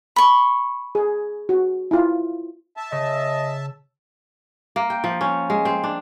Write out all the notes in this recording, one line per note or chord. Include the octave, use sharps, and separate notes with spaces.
B5 C#6
G#4
F#4
E4 F4
E5 A5
C#3 D#5
A#3
G5
F3
C#4
G#3
C4
D4